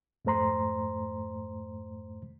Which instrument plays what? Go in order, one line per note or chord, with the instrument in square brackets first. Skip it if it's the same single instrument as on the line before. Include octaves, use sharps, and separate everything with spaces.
[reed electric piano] F2 G#2 A3 C5 A#5 C6